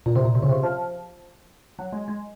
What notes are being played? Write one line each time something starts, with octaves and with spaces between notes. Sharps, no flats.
A#2
C3
A#2
C3
C#3
C3
F3
F#3
G#3
G#3